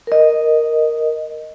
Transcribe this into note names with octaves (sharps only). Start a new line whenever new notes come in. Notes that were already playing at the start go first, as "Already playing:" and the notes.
A#4 D#5